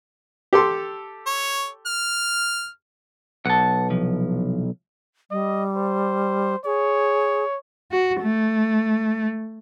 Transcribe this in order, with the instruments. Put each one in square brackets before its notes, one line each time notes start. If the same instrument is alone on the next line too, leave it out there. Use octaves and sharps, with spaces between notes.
[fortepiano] G4 A4 C6
[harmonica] C#5
F6
[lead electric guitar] B1 [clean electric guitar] F#5 A5
[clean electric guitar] C2 F3
[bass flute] G3 [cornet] D#5
[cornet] C5
[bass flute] G#4 [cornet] C#5
[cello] F#4
A3